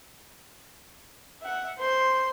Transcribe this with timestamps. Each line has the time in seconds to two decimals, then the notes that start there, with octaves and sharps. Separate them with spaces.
1.42 E5 F#5
1.79 C5 C6